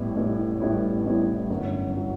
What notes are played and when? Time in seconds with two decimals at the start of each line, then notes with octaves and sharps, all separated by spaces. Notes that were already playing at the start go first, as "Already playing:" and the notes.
Already playing: A1 A2 G3 B3 E4
0.16 A1 A2 G3 B3 E4
0.60 A1 A2 G3 B3 E4
1.05 A1 A2 G3 B3 E4
1.50 G1 F#2 F#3
1.97 F#3